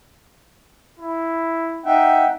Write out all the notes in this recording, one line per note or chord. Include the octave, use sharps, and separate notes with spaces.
E4
D#4 E5 F#5 G5